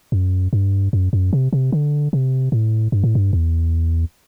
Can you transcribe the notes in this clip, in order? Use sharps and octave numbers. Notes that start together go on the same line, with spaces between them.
F#2
G2
F#2
F#2
C3
C3
D3
C3
A2
G2
A2
G2
E2